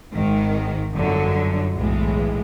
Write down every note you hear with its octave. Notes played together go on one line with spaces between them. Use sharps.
G#1 G#2 D#3
G1 F#2 D3 F#3
B1 A2 E3 G#3